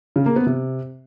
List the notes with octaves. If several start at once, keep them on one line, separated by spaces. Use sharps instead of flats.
C#3
A#3
B3
C3